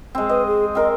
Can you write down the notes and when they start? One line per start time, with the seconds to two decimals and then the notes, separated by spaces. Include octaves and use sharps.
0.15 G#3 C4
0.29 B4 D#5
0.47 G#4
0.75 C4 A#4 D#5